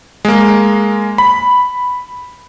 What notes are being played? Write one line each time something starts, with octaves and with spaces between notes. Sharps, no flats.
G#3 A#3
B5